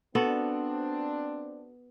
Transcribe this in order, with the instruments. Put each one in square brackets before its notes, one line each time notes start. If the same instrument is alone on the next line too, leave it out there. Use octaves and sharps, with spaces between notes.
[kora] B3 F#4 A4 [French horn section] C4 D4